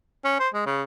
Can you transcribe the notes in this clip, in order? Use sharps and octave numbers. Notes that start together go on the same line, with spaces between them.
C#4
C5
G#3
C#3